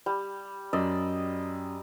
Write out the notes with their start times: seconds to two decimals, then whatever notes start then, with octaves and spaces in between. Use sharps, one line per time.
0.06 G3
0.73 F#2 D5 D#5 E6